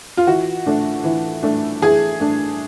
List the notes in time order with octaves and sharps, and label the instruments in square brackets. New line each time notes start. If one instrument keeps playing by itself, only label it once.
[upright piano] F4
[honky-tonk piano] E3 [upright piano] F#4
[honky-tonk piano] A3 D4
E3
A3 D4
[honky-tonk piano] E3 [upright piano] G#4
[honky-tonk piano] A3 D4